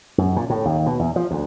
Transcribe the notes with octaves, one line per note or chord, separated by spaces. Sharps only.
F#2
A#2
A2
D#2
B2
E2
F3
D2